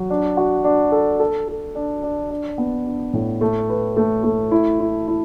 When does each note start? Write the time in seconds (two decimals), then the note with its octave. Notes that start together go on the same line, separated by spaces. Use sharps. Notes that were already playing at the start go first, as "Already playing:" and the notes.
Already playing: F#3
0.10 D4
0.37 F#4
0.64 D4
0.92 A4
1.20 A4
1.48 A4
1.75 D4
2.03 D4
2.30 D4
2.58 B3
2.86 D4
3.13 A2
3.41 A3
3.69 B4
3.97 A3
4.23 A3
4.51 E4
4.80 E4
5.08 E4